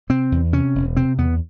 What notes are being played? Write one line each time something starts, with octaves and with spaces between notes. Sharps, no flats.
C3 C4
E2
C3 C#4
E1
C3 C4
E2 B3